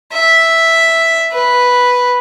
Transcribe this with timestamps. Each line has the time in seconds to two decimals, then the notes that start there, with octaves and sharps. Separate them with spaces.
0.13 E5
1.33 B4